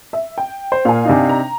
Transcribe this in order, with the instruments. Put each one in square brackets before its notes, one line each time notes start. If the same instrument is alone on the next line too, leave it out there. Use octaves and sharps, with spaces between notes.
[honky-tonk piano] E5
G5
[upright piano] C5
[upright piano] A#2 [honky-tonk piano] F5 G#5
[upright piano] C3 D4 D#4
[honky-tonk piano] A#5